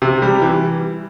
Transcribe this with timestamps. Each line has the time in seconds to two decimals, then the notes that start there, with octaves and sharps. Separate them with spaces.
0.02 C3
0.22 G3
0.42 E3